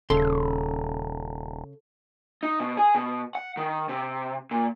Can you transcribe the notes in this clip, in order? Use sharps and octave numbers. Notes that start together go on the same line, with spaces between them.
D#1 C#3 A4 C6
D#4
B2
G#4
B2
F#5
D#3
C3
A#2